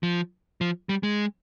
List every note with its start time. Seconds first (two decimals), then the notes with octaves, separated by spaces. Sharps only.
0.03 F3
0.61 F3
0.89 G3
1.03 G#3